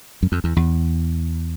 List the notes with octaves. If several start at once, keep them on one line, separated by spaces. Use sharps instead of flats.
F#2
F2
E2
E2